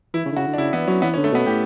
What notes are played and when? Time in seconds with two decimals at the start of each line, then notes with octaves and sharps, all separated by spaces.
0.14 E3 E4
0.25 C#3
0.32 D3
0.36 C#3 F#4
0.48 D3
0.54 D4
0.58 C#3 E4
0.73 E3 B3
0.87 F#3 C#4
1.02 E3 B3
1.14 C#4
1.17 D3
1.24 A3
1.32 B2 B3
1.46 A2 G4